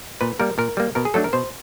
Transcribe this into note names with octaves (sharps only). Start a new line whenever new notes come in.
A#2 B4
G3 A#3 A#4
A#2 A#4
G3 A#3
B2 A#4
G#4
F#3 A3 D4 A4
A#4
B2 C5